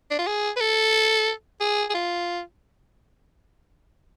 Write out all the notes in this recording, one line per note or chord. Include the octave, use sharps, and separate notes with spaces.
D4
F4
G#4
B4
A4
G#4
G#4
F4